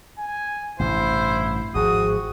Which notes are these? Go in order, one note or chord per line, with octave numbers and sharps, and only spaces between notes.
G#5
A1 G2 C3 E4 C5
G#1 F3 F#4 G#4 D#6